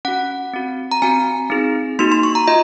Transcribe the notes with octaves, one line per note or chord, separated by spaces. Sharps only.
C#4 F#4 F#5
C4 F#4
A#5
C4 F#4 G#5
C4 D#4 G#4
A#3 D#4 F#4 C6
C6
C#6
A#5
F4 D#5